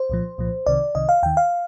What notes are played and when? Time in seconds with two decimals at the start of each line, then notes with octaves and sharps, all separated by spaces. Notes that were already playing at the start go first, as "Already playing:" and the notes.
Already playing: C5
0.10 C2 A#2 F3
0.38 C2 A#2 F3
0.66 C2 C3 D#3 D5
0.95 C2 C3 D#3 D#5
1.09 F5
1.23 D#2 D#3 G5
1.37 F5